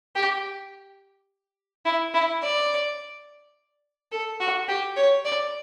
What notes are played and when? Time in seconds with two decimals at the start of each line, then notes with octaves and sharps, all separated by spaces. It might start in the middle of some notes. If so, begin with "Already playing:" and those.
0.15 G4
1.85 E4
2.14 E4
2.42 D5
4.12 A4
4.40 F#4
4.68 G4
4.96 C#5
5.25 D5